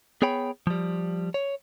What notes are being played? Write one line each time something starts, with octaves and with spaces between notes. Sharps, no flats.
B3 G#4 C#5 G5 B5
F3 G3
C#5